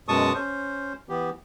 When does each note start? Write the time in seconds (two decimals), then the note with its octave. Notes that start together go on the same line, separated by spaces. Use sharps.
0.08 F#2 B2 G#3 A5 C#6 D#6
0.34 C#4 C5
1.09 E3 B3 G4